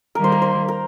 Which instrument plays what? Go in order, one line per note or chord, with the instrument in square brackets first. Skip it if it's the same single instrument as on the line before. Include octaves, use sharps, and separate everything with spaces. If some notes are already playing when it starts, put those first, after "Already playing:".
[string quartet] D#3 G3 A#3 [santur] A#4
[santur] C5
A#4
C5
A#4